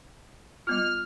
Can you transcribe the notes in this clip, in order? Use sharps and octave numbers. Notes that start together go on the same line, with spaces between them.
G3 B3 F4 F6